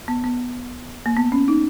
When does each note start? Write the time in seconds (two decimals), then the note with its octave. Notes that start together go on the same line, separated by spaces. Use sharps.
0.08 B3
0.24 B3
1.06 A#3
1.17 B3
1.32 C#4
1.48 D#4